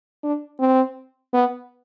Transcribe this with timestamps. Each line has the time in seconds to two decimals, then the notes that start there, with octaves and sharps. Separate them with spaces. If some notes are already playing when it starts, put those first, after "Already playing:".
0.23 D4
0.59 C4
1.33 B3